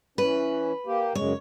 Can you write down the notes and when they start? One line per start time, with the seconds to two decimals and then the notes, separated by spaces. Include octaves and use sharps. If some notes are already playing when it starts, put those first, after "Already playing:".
0.18 E3 C#4 B4
0.87 A#3 G4
1.15 F#2 C#3 G#3 C#5